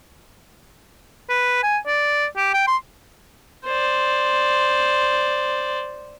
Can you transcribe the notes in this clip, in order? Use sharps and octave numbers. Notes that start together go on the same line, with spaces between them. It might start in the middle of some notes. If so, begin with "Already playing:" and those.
B4
G#5
D5
G4
G5
C6
C5 D5